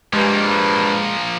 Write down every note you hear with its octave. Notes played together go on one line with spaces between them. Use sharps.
G2 F3 G#3 A#3